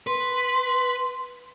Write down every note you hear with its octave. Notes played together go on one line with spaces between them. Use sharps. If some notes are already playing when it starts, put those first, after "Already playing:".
B4 C6